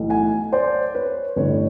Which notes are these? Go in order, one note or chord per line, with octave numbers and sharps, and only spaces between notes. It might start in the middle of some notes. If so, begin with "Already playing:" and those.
Already playing: B1 A2 E3
F#5 G#5
C5 D5
B4 C#5
A1 G2 D3 B4 C#5